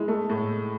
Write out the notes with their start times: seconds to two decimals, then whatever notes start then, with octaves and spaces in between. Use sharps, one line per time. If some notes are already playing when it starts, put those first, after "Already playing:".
Already playing: G#3 E4
0.08 A3
0.29 A2